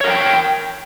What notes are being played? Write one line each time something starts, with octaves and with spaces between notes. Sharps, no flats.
A#4 C#5 F#5 G5